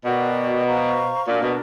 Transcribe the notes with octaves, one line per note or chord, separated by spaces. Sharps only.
B2 F#4 A#4 D5 G5
C5 F5 A#5 C#6
A#2 D4 F#4 A#4 D5
B2